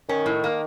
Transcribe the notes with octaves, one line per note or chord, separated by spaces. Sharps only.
D#3 C#4
A2
A#3